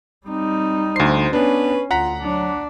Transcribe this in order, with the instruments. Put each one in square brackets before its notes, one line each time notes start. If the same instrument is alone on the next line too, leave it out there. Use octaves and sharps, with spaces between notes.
[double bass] G3 D#4 [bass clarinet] C4
[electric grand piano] D2 C7 [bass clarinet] C5
[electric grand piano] B3 D4 [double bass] C#4 [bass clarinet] B4
[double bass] D2 [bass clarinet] F4 [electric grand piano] F#5 A#5 B6
[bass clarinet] F#3 [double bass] D4